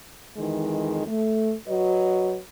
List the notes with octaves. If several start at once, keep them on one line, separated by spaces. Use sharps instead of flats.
F2 D#3 E3 G#3
A3
F#3 F#4 B4 D#5